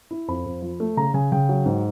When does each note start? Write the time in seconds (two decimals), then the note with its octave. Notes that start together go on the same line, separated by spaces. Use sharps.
0.11 E4
0.28 F2 B5
0.46 F2
0.62 F3
0.80 A3
0.97 C#3 A#5
1.14 C#3 G#5
1.32 C#3 G5
1.49 F#3
1.66 G#2